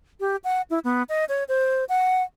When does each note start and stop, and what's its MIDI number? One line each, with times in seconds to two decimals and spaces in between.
0.20 0.36 67
0.44 0.62 78
0.70 0.79 64
0.84 1.03 59
1.09 1.25 75
1.29 1.44 73
1.49 1.84 72
1.89 2.23 78